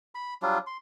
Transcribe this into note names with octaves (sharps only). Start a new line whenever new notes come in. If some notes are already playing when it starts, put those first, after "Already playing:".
B5
F#3 G3 D4 F4
C6